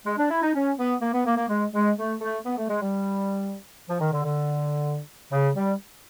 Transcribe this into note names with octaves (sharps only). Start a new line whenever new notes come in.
G#3
D4
E4
D#4
C#4
B3
A#3
B3
A#3
A#3
G#3
G#3
A3
A3
B3
A3
G#3
G3
F3
D#3
D3
D3
C#3
G3